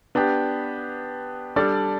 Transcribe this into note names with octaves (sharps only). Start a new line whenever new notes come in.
B3 D4 G4
G3 D4 A4 D5